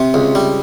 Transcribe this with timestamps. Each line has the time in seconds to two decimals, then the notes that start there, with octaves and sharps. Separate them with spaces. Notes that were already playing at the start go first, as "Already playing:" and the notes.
Already playing: C3
0.14 C#2
0.35 G3